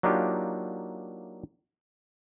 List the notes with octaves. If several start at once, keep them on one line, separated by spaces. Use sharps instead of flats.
F#3 A#3 D4 D#4 F4 G4